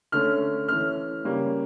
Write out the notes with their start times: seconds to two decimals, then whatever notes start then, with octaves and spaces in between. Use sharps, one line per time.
0.12 D3 A3 C#4 F6
0.68 E3 A3 C#4 F6
1.24 C#3 G3 A#3 C#4